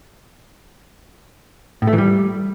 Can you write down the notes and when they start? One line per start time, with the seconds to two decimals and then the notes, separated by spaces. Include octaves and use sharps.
1.82 A2
1.87 A3
1.93 E3
1.98 G3